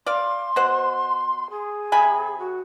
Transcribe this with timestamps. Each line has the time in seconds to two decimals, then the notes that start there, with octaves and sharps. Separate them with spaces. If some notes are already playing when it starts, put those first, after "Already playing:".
0.06 D5 F5 C6
0.56 B2 C5 F#5
1.50 G#4
1.92 C3 G#5 B5
2.38 F#4